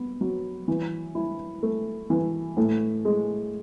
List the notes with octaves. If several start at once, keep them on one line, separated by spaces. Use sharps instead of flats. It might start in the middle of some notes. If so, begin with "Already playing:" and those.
Already playing: B3
F#3
E3
E4
A3
E3
A2
G#3